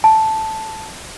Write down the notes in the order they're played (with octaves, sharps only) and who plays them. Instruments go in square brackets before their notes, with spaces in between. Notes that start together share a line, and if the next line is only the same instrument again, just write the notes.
[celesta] A5